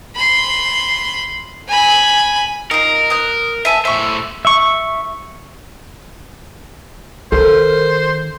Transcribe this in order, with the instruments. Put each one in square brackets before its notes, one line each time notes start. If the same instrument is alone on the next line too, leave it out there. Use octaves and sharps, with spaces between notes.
[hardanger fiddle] B5 C6
G#5 B5
[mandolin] D#4 F4 [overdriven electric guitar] A#4
[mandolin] D#6 F#6
E5 G#5 A5
[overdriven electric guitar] A2 C5 [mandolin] E5 C#6
[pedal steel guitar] E5 C#6
[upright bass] D#3 [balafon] A4 [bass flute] A#4 [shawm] C5